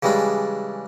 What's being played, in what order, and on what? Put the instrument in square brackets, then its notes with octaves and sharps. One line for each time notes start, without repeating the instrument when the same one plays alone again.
[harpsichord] C#3 E3 G3 G#3 D4